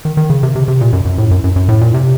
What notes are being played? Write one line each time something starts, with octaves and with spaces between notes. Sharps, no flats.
D#3
D#3
C#3
C3
C3
C3
A#2
F#2
F#2
A2
F#2
F#2
F#2
A2
A#2
C3